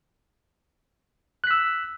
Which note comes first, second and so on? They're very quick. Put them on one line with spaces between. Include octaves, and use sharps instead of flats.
F#6 B6 E6